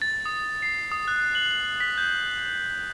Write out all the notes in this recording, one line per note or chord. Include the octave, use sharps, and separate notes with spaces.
A6
D#6
C7
D#6
F#6
F#7
B6
G6